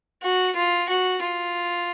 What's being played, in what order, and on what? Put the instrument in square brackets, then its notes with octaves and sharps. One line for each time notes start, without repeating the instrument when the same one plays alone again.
[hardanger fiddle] F#4
F4
F#4
F4